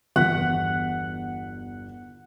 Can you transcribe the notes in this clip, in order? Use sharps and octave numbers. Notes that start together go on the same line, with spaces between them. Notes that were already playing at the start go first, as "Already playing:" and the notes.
G1 E2 F#5 B6